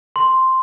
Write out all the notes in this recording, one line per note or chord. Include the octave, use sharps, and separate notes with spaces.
C6